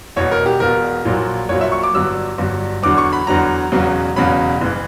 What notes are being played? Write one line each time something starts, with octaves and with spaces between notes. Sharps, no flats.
E1 E2 B2 C#5
A#4
G4
E1 E2 B2 A#4
A#1 A#2 F#3
A#1 A#2 F#3 C#5
E5
C#6
D6
G1 G2 F#3 E6
G1 G2 F#3
E2 D3 F#3 D6
C#6
B5
E2 D3 F#3 A#5
E1 E2 C#3 F#3
E1 E2 C#3 F#3 B5
F#1 E3